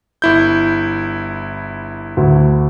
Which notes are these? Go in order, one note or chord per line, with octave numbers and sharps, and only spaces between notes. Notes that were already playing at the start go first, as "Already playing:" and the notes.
G1 E4 G6
D2